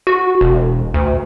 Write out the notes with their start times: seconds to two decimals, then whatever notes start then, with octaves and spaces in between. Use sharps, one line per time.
0.07 F#4
0.41 E1
0.94 D2